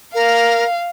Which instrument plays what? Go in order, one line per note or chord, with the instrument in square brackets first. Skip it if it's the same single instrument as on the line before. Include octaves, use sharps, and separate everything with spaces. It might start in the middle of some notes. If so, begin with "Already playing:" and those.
[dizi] A#4 [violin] F5